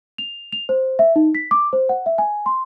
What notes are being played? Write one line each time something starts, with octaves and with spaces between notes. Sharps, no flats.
F7
F7
C5
E5
D#4
B6
D6
C5
F#5
E5
G#5
C6